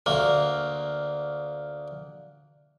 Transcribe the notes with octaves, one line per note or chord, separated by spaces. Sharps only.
D2 A#3